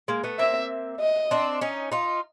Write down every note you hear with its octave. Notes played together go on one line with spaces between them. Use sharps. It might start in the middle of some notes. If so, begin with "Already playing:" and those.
G#3 A#3
A3 B3
A#3 C4 E5
D#5
C4 D4
C#4 D#4
D#4 F4